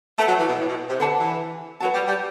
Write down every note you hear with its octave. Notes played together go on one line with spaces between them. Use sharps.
A3 B4 F#5 A5
F#3
E3
B2
A2
B2
C3
D3 B4 F#5 A5
E3
F#3 B4 F#5 A5
G3
G3